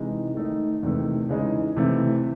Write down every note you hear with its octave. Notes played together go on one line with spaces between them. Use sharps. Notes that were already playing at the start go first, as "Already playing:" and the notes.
Already playing: C3 E3 G#3 D#4
D#3 A3 D#4
E2 C3 D#3 A3
C#3 E3 G#3 D#4
C3 E3 A3 C4 E4